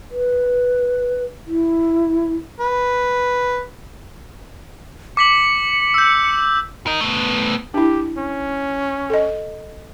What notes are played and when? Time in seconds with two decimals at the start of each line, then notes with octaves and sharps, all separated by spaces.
0.11 B4
1.47 E4
2.60 B4
5.17 D6 B6 C#7 F#7
5.94 E6 G6
6.87 A#4 D#5
7.01 A3 B3
7.74 D4 E4 G4
8.18 C#4
9.10 A4 D#5